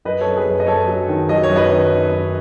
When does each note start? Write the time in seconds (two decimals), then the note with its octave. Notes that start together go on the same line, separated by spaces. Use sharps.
0.05 F#2 B4 D#5
0.21 F#2 A4 C#5
0.36 G#4 B4
0.46 F#2
0.60 D#5
0.67 F#2 A4 C#5
0.88 F#3
1.09 D#3
1.29 F#3 D#5
1.43 C#5
1.50 F#2
1.56 B4 D#5
1.71 D#3
1.91 D#3
2.12 F#2